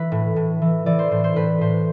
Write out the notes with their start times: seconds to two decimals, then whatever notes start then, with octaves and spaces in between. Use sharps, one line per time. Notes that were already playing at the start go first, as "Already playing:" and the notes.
Already playing: E3 B4
0.12 A2
0.36 A2
0.62 E3
0.86 E3 D5
0.99 C5
1.11 A2 C5
1.24 C5
1.36 A2 B4
1.61 A2 C5